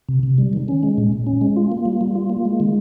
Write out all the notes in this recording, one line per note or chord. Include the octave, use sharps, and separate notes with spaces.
C3
C3
G3
D#3
C#4
G#3
A#2
A#2
C#4
G#3
F4
A#3
G3
G3
F4
A#3
G#3
D#3